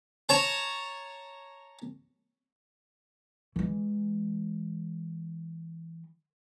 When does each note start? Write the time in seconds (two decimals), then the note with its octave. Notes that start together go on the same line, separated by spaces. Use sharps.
0.29 C#5 A5 A#5
3.56 E3 G#3